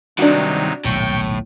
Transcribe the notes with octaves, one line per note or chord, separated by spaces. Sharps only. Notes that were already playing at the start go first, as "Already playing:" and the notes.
G2 C3 D#3 F#3 D4 D#4 F#4
D#1 B1 A2 G5 C#6